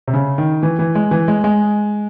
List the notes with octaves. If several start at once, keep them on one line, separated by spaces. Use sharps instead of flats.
C3
C#3
D#3
E3
E3
G#3
E3
G#3
G#3